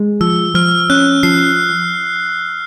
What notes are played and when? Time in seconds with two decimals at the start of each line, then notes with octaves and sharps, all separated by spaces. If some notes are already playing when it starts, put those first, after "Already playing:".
Already playing: G#3
0.21 F3 E6
0.55 F3 F6
0.90 C#4 F#6
1.23 F3 C7